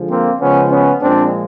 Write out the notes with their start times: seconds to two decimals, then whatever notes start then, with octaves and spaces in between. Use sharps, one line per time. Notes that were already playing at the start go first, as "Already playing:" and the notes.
Already playing: D3 F3 G#3
0.10 A#3 C4
0.41 C#3 F3 G#3 B3 C#4
0.71 B3 C#4
1.01 A#2 F3 G#3 C4 D4